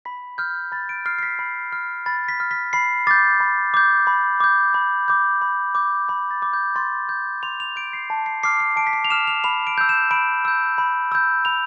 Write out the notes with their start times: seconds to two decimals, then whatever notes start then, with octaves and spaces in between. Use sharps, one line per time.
0.05 B5 B6
0.38 F6 G6
0.72 B5 A6
0.89 D7
1.06 F6 C7
1.19 C7
1.23 B6
1.39 B5
1.72 F6
2.06 B5 A6
2.28 B6
2.40 F6
2.51 B6
2.73 B5 C7
3.07 D6 G6 A6
3.40 B5
3.74 D6 G6
4.07 B5
4.40 D6 G6
4.74 B5
5.08 D6 G6
5.42 B5
5.75 D6 G6
6.08 B5 G6
6.31 A6
6.42 D6 G6
6.53 G6
6.75 C6 A6
7.09 G6
7.43 C6 F7
7.60 F7
7.76 G6 D7
7.93 C7
8.10 A5
8.26 C7
8.43 D6 F6 C7
8.60 C7
8.76 A5 D7
8.87 B6
8.93 C7
9.05 F7
9.10 D6 F6 E7
9.27 F7
9.44 B5 F7
9.67 D7
9.78 E6 G6
9.89 E7
10.11 B5 D7
10.45 E6 G6
10.78 B5
11.12 E6 G6
11.45 B5 F7